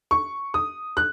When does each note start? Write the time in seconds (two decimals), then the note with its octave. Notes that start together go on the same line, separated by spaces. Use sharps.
0.11 C#6
0.54 D#6
0.97 F#6